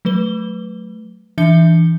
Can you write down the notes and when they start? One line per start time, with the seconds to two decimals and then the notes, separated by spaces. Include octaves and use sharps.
0.05 F#3 A3 B4 G7
1.38 E3 D4 E5 G6 C#7 G7